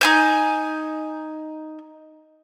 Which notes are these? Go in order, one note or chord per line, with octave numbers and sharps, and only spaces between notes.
D#4 G#5 G6